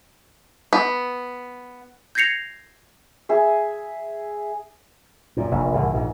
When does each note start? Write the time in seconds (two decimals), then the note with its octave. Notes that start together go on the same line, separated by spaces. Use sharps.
0.73 B3
2.15 G6 G#6 A#6 C7 C#7 F7
3.29 G#4 E5
5.37 F#2 A#2
5.51 F1 A#1
5.75 C2 A2 E3
5.93 A#1 G#2